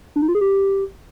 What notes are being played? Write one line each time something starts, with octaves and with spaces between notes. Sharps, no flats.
D4
D#4
F4
G#4
G4